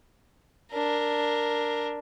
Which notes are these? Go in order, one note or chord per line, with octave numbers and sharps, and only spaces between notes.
D4 A#4